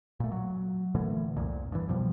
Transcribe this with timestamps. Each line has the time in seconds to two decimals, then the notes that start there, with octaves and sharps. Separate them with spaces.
0.20 A#2 A3
0.32 F#3
0.95 A#2 D3 E3 A3
1.37 C2 F2 A#2
1.72 G2 E3
1.88 F2 B2 F3 G3